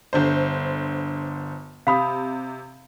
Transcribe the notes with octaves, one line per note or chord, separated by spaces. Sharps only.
G1 D3 C5
C3 F5 B5 D#6